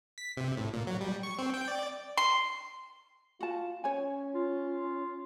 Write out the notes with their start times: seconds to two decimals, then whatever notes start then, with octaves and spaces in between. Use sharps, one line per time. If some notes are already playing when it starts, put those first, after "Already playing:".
0.18 B6
0.37 C3
0.57 A2
0.73 A#2
0.87 F#3
1.01 G3
1.23 C#6
1.39 C4
1.54 G5
1.68 D5
2.18 C6
3.40 F4 F#4 A5
3.84 C#4 C#5 G#5
4.35 F4